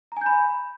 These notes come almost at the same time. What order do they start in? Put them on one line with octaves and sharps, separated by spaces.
A#5 G#5 G6 B5